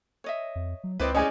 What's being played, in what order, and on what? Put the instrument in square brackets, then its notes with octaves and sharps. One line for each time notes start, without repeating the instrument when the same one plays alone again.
[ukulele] C#5 D#5 E5
[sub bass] F2
F#3
[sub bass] C#2 [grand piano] C4 B4 [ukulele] E4 D5 D#5
[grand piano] G#3 C#4 [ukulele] C5 D5 [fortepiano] D#5 G#5